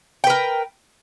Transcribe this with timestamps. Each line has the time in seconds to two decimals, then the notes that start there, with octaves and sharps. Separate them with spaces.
0.24 G5
0.27 B4
0.30 A#4